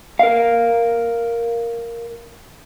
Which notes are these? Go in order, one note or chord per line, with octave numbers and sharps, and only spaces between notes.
A#4 F5